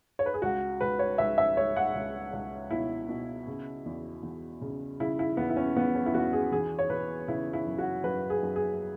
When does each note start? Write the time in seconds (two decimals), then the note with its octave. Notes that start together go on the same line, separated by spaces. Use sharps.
0.19 C#5
0.26 B4
0.34 G#4
0.42 C#2 F#4
0.81 C#2 B4
0.99 C#5
1.18 C#2 E5
1.38 E5
1.57 C#2 C#5
1.76 F#5
1.95 C#2
2.33 C#2
2.71 B2 E4
3.09 B2
3.47 C#3
3.86 E2
4.23 E2
4.61 C#3
5.00 C#3 E4
5.19 E4
5.37 E2 B3
5.49 E4
5.56 C#4
5.76 E2 B3
5.95 C#4
6.06 E4
6.14 E2 F#4
6.33 G#4
6.52 E3 G#4
6.79 C#5
6.90 E3 B4
7.28 C#3 E4
7.53 E4
7.67 F#2
7.78 F#4
8.04 F#2 B4
8.30 G#4
8.43 F#2
8.56 G#4